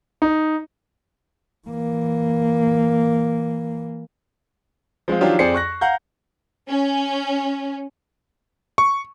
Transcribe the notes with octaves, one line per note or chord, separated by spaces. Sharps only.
D#4
E3 A#3
F3 G#3 C4 F4
D#3 F3 F#3 D4 F4 G4
F2 G#4 C5 D5 C7 C#7
C#6 F#6 A#6
F5 F#5 A#5 G6
C#4
C#6